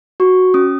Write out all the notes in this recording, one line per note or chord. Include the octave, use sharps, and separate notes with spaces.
F#4 C#6
C#4 D#6